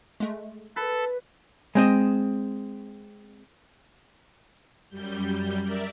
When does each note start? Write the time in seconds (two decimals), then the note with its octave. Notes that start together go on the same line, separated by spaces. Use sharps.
0.20 G#3 A3
0.76 A4 B4
1.75 G#3 C4 D#5
4.90 F#2 G3 G6
5.61 A#4 D5 E5